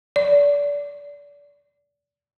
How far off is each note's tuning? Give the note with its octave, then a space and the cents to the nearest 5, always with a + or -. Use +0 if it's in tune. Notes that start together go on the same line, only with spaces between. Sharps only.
D5 -30